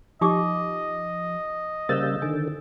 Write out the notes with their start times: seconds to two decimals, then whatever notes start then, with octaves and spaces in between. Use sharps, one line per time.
0.21 F3 D#4 G4 D#5 D6
1.89 C#3 G3 A#3 A#4 C5 E6 G6 A6
2.22 D3 D#3 G#5